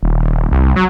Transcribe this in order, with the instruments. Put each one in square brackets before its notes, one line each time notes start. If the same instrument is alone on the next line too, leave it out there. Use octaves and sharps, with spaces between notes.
[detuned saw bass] D#1
C2
F#3